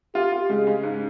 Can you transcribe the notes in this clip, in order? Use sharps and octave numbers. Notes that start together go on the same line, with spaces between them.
F4 G4
F4
C#3 G#3
C#3
G#2